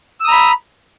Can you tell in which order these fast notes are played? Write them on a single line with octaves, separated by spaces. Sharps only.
E6 D#6 A#5 B5